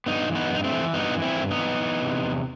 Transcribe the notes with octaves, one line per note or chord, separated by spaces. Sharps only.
G2 B3 D#4
E3
B3 D#4
G2 D#4
A3 C4
E3
G2 B3 D#4
E3
C4 E4
G2
B3 D#4
E3
E3
C3
E2